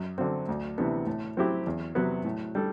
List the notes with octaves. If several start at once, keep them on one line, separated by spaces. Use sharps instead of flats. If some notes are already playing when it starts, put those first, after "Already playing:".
Already playing: F#2
D3 F#3 C4
D2
C3 E3 B3 D4
A2
F#3 C4 E4 G4
E2
C3 F#3 B3
A2
G3 D4 A4